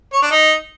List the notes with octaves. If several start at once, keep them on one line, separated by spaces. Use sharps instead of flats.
C#5
D4
D#4